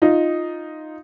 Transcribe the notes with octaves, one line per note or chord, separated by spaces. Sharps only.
D#4 F4